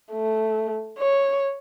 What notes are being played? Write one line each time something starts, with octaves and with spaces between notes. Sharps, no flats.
A3
C#5